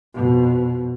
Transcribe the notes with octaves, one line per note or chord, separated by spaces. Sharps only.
F2 B2